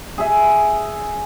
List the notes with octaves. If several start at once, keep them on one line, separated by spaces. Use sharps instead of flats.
G#4 E5